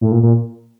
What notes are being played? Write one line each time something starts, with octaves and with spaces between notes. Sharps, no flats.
A2
A#2
A#2